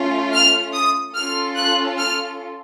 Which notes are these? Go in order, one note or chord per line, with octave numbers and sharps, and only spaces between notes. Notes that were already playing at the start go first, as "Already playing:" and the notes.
Already playing: A3 C#4 F4
F6
D#6
C#4 F4 A4 F6
F#6
F6